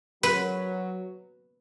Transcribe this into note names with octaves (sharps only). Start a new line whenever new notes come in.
F#3 B4